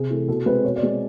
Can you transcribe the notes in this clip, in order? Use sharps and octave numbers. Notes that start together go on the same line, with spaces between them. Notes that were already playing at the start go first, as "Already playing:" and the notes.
Already playing: C3 G#4
E3 A3
B2 A4
G#3 C4 B4
B2 C#5
D5
G#3 C4